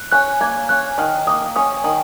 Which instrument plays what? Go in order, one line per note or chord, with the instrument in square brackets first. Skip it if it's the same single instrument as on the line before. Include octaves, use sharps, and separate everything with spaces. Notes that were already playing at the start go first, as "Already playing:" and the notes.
Already playing: [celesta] F#6
[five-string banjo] C#4 [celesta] F#6
[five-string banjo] A#3 [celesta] G#6
[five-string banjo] C#4 [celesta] F#6
[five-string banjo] D#3 [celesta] F6
[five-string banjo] A#3 [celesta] D#6
[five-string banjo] C#4 [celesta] D#6
[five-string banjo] D#3 [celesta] D#6